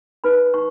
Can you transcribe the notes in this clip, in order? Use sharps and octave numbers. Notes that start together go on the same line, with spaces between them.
D#4 B4 B5
D#4 C#6